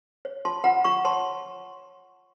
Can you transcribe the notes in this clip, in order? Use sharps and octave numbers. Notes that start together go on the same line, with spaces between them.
C#5
F4 A5 C6
F4 F#5 A#5
F4 A#5 C#6
C#5 A5 C6